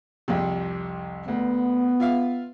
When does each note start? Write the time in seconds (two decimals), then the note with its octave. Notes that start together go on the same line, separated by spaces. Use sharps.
0.28 C2 F2 C3
1.28 D2 B3
2.00 F4 E5 F5